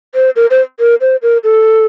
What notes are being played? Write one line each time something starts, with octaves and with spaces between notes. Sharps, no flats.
C5
A#4
C5
A#4
C5
A#4
A4